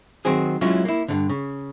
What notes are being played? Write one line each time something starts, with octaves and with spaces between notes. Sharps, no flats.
D#3 F#3 C4 G#4
F#3 G#3 C#4 E4 F4
A#3 E4
G2 A#2 D3
C#3